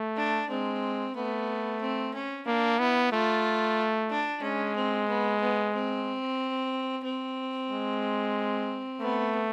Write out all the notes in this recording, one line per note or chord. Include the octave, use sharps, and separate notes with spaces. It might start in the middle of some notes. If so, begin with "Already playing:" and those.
Already playing: A3
D4
G#3 C4
A3 B3
C4
C#4
A#3 D4
B3 E4
A3 F4
D4
G#3 C#4
C4
B3
B3
C4
C4
G#3
A3 B3